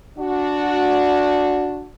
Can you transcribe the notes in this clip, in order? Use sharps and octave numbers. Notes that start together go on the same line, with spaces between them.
D4 F#4